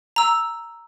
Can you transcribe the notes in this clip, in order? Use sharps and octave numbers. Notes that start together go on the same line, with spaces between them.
A#5 E6